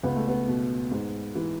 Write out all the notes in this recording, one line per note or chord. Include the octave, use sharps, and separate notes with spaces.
C#2 B3
A3
B3
B2
G#2
E3